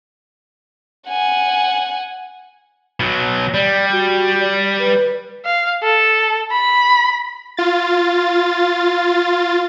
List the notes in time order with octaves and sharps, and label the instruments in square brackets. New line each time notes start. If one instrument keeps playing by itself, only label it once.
[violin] F#5 G#5
[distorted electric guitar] B2 F#3
[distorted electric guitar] G3 [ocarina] D5
[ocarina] F#4
D5
B4
[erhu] F5
A4
B5
[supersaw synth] F4 A6